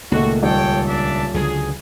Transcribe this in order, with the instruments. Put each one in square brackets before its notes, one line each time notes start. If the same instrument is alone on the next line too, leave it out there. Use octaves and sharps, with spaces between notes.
[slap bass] C#2 [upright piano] A#2 D#3 A3 [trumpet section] F#4
[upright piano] D#1 [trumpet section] A4 C#5 G5
[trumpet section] D4 E5 A5
[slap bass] C#2 D3 F#3 [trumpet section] G#4